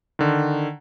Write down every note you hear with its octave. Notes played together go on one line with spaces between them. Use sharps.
D3 D#3